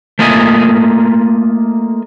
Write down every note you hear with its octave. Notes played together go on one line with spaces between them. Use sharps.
A3 A#3 F4 D#5 F#5 G#5